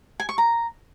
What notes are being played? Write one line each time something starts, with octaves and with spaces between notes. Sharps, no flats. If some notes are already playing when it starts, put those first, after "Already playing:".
G#5
C#6
A#5